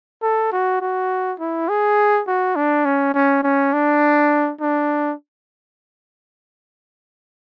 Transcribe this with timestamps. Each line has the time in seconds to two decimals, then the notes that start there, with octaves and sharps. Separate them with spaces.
0.22 A4
0.52 F#4
0.81 F#4
1.40 E4
1.69 G#4
2.27 F#4
2.56 D4
2.85 C#4
3.14 C#4
3.43 C#4
3.73 D4
4.61 D4